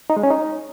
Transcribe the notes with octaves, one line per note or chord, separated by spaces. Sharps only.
D#4
G#3
C#4
D#4